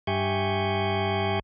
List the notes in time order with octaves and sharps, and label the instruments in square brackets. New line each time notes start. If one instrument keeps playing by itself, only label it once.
[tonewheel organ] G2 G4 E5 G#5 C#6 G6